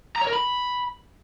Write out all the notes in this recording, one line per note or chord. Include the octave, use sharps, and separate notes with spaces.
A#5
C#5
A#4
B5